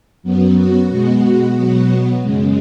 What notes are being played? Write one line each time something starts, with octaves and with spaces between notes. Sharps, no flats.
F#2 F#3 B3
F#4
B2 G#3 B3 F#4
B2 F#3 B3
F#2 C#3 G#3